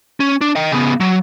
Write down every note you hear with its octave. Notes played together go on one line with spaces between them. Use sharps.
C#4
D4
D#5 G5
C#3 B3
F#3